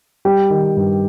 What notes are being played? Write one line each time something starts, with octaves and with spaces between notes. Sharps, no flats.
G3 G4
D#3
G2